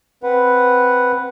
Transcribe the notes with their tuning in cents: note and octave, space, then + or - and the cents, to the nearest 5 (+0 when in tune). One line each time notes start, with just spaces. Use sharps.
C4 +0 B4 +0 F#5 +0